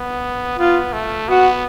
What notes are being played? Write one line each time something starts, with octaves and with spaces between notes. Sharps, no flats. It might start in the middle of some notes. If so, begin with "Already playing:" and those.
Already playing: B3
B3 F4
A3
B3 F#4